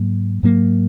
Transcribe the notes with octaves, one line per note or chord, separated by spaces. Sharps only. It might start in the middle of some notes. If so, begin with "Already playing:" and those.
Already playing: G#2 F#3 A#3
G#2 F#3 A#3